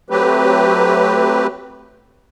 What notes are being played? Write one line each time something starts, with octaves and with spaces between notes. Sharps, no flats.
F#3 A3 C4 G4 B4